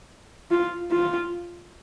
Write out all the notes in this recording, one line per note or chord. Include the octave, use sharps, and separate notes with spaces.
F4
F4